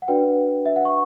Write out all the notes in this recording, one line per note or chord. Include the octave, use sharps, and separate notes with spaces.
F#5
D4 F#4 B4 D5 G5
E5
F#5
C#6